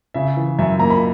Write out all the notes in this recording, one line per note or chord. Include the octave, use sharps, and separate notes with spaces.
C#3 E5
E3
F#2 E5
A#3 A#5
B5